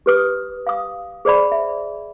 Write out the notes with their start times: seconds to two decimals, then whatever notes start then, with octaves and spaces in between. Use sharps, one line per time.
0.06 G4 B4 D#6
0.67 F5 D#6
1.25 G#4 C5 D5 B5
1.52 E5